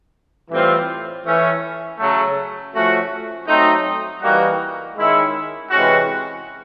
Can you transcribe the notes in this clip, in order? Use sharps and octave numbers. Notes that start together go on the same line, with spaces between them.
A2 E3 G3 C4 F4
E3 A3 C#4
C#3 F#3 A3
F3 A3 C#4 F#4
F#3 A3 C4 D#4
E3 G3 A#3 D#4 F#4
D#3 G#3 C#4 E4
C3 E3 G#3 C#4 F#4